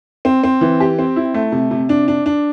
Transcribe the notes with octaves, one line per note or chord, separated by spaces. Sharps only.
C4
C4
E3
G4
C4
E4
A3
C3
C3
D4
D4
D4